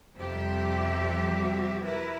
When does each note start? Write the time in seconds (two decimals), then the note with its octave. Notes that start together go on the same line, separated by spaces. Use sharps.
0.15 F2 C3 F3 G3 G4 E5
1.83 E4 A#4 B4 E5